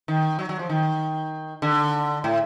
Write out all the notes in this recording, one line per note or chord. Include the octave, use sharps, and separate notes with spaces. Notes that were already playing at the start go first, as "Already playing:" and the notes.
D#3
F#3
F#3
F3
D#3
D3
A2